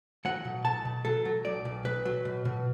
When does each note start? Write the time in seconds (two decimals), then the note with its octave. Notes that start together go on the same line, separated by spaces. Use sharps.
0.25 F#3 F#5
0.45 B2
0.65 B1 A5
0.85 B2
1.05 F#3 A4
1.25 F#3
1.45 B1 D5
1.65 B1
1.85 B1 B4
2.05 F#3
2.25 B2
2.45 B2